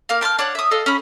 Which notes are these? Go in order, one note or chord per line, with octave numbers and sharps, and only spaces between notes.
A#3 F5
G5 A5 B5 F6
D4 C#5 F#5
E5 D#6
A4 D#5 F5 E6
C#4 B5